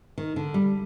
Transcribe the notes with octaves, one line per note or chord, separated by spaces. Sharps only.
D#3
D3
G3